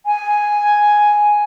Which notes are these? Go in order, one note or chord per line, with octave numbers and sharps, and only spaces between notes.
G#5